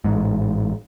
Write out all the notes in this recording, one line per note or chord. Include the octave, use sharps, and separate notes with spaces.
A1 G#2